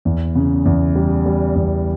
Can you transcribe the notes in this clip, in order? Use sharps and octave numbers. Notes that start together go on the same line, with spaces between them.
E2
C#3
E2
G3
G3
E2